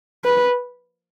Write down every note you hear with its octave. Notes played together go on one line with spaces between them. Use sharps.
B4